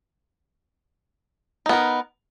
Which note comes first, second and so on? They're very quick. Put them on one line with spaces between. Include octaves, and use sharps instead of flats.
D#4 B3 A#4